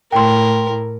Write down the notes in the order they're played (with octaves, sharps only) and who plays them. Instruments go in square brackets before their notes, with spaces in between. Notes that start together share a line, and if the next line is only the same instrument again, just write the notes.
[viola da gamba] A2 [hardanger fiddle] A#4 [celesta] G5 C6